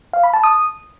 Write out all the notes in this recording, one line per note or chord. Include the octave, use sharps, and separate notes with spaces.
F5
B5
A5
D#6